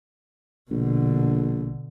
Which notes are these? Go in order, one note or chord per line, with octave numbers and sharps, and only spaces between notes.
A#1 B2 D3